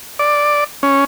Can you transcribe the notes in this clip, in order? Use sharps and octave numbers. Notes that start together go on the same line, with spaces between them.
D5
C#4